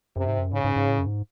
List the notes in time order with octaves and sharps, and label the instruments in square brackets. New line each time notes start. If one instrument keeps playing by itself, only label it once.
[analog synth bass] F#2 [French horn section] C3
[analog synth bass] G#2
F#2
[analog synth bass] G#2 [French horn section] C#3
[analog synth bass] G#2
G#2
A2
F#2
G#2